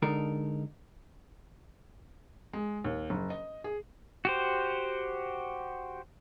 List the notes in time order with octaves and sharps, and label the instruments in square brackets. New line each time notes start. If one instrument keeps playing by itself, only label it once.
[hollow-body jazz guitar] D3 G#3 D#4 A4 A#4
[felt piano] G#3
D#2
F#1
D#5
G#4
[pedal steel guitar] F#4 G4 C5